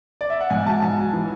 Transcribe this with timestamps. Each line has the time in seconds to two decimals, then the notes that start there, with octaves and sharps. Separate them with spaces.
0.21 D5
0.30 E5
0.41 F#5
0.50 G#2 G#5
0.66 F#3 A5
0.82 G#2 G#5
0.98 F#3
1.13 E3